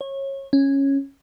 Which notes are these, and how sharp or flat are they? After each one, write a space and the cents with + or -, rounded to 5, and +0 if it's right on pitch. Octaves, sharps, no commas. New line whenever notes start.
C#5 -25
C#4 -10